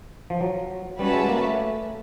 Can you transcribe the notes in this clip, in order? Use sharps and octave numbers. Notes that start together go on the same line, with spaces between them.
F3
F#3
G3 C#4 F#4 B4 E5 A5
G#3
A#3
A3